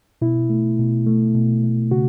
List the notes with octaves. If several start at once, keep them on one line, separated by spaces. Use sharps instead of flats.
B2 E4
A3
B2
A3
B2
A3
C#3 F#4